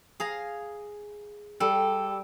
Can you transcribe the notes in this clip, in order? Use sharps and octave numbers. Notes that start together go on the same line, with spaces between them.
G#4 F5 A#5
G3 A4